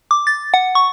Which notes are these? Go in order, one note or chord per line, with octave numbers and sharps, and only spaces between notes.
D6
A6
F#5
C#6